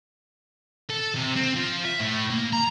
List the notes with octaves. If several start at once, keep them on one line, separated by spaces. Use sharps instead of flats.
A4
C3
C4
F3
E5
A2
A#3
A#5